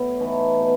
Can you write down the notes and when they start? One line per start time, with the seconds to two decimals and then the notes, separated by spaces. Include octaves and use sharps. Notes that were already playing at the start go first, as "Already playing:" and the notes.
Already playing: A2 F#3 B3
0.20 E3 A3 D#4
0.60 B2